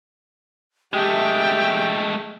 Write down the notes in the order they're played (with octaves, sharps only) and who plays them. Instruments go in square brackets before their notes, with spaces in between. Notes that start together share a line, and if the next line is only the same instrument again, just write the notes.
[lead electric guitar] G#3 A3 [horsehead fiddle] G4 E5 [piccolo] G5